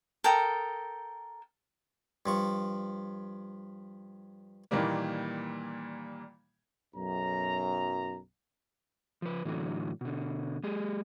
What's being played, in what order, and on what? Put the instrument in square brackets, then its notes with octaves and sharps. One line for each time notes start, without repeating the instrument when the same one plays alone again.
[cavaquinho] A4 A#4 G5 D#6
[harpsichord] G2 F3 C#6
[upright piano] A#2 D#3 E3 G3 A#3
[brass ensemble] B1 F#2 A#5
[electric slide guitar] F3 B4
A2 D3 E3 F#3
B2 D3
G#3 G4 G#4